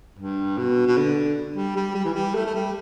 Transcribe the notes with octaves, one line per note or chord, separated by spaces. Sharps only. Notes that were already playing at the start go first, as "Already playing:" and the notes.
G2
B2
B2
D3
G3
G3
G3
E3
G3
A3
A3
G3